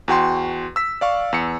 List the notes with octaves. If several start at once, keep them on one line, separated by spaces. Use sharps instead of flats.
E2 F#4 G5 C6
E6 B6
D5 F5 C#6
E2 C#7